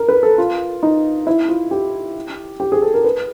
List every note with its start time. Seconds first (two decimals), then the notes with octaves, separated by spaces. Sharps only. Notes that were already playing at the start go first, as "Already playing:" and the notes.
Already playing: A#4
0.08 B4
0.23 A4
0.38 F4
0.83 D#4
1.27 E4
1.48 F4
1.71 G4
2.60 G4
2.72 G#4
2.82 A4
2.94 A#4
3.05 B4